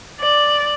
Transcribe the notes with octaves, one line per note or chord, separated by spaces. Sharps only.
D5